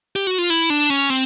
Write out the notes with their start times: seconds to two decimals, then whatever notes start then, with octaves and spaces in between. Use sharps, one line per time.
0.16 G4
0.27 F#4
0.38 F4
0.50 E4
0.70 D4
0.90 C#4
1.10 C4